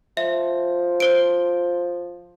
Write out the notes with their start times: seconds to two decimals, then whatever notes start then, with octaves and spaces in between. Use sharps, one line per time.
0.17 F3 E5
1.00 C5 D7